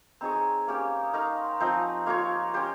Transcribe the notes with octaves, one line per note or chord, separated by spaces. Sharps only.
C4 D#4 G#4 C#5 A#5
A#5
A#5
A#3 C#4 G4
D#6
D#4 A#4 F5 C#6
C6
A#5
F3 C4 D#4 G#5
G#5
A#5
A#3 F4 A#4 C#5 C6
C#4 G4 C5